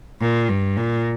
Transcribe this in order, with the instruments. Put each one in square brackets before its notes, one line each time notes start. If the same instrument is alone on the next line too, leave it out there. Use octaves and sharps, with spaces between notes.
[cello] A#2
G2
A#2